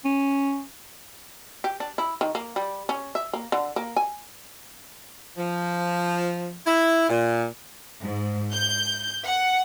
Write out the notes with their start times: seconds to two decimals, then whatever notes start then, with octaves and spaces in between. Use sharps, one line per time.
0.05 C#4
1.64 G4
1.80 D4
1.98 E4
2.21 D#3
2.35 A#3
2.56 G3
2.89 C#4
3.15 E5
3.33 A#3
3.52 D3
3.76 A#3
3.96 G#5
5.37 F3
6.65 E4
7.09 A#2
8.02 G#2
8.53 G6
9.25 F#5